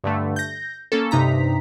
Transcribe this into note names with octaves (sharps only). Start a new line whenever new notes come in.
G2 D3 A3
G6 A#6
A#3 C#4 A4
G2 C3 D#4 A#5 B6